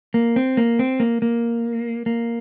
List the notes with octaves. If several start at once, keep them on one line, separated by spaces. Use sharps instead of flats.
A#3
C4
A#3
C4
A#3
A#3
A#3